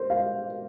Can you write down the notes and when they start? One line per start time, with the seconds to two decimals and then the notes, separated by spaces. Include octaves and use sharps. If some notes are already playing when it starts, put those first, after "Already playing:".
Already playing: A#4 C5
0.10 F5